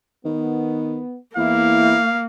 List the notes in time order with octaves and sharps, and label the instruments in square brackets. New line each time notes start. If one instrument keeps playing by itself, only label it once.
[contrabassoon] D#3 [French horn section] B3
[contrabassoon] E2 [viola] A#3 [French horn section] E4 [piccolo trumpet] F5